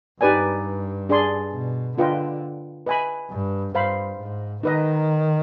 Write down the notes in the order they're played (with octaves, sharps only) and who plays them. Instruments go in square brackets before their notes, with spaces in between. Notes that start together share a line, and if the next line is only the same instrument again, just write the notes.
[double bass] G2 [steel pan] D#4 G4 B4 D5 G#5
[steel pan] D4 G#4 D5 G#5 C6
[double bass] B2
[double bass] D3 [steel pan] D4 F4 B4 D#5 G5
[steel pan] B4 D#5 G#5 B5
[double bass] G2
[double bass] G2 [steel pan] C5 F5 B5
[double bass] G#2
[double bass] D#3 [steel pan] D#4 B4 D#5